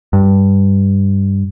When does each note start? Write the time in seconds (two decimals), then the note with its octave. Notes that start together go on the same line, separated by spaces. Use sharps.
0.13 G2